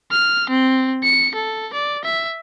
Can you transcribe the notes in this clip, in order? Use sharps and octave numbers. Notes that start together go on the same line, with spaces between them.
F6
C4
C#7
A4
D5
E5